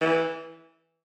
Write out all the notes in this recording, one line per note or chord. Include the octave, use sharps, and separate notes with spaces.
E3